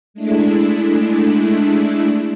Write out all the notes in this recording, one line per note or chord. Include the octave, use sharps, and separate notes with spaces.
G#3 A3 D4 E4